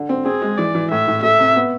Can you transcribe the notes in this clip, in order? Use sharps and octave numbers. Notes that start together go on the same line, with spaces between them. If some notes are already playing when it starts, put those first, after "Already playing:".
Already playing: D3
C4
C4 G#4
G#3
E3 D5
E3
A2 E5
A2
A3 E5
C3
B3